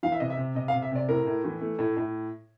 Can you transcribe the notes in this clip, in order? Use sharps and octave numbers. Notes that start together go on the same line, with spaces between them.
E3 F5
E5
C3 D#5
E5
C3
C3 D#5
F5
C3
E5
C3 D5
A2 A#4
A2
E3
A3
A2
A2